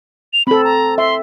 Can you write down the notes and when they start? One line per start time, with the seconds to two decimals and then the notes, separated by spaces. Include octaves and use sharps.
0.33 F7
0.47 C4 A4 B5
0.64 A#5
0.98 E5 C6